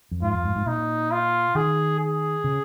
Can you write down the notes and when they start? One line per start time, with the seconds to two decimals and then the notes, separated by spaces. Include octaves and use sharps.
0.11 F2
0.22 G#2 F4
0.34 F2
0.45 G#2
0.56 G#2
0.66 A#2 D#4
1.11 F4
1.55 D#3 G#4
1.99 G#4
2.44 C#3